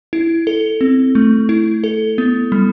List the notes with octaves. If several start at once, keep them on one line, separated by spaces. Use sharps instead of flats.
E4
A4
C4
A3
E4
A4
B3
G3